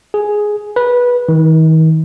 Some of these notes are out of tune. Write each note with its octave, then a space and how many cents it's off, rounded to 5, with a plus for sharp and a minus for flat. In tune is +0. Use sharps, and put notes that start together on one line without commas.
G#4 +5
B4 -15
D#3 +40